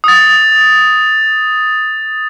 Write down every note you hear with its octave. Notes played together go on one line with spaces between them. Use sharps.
D#6 A6